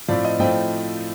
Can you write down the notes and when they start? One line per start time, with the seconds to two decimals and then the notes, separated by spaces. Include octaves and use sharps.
0.08 A2 F3 A3 C4 F4 D5
0.25 D#5
0.39 A2 F3 A3 C4 F4 D#5 G5